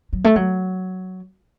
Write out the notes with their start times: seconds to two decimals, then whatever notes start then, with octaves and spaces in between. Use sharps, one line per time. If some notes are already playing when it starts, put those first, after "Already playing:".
0.13 F#3
0.24 A3
0.36 F#3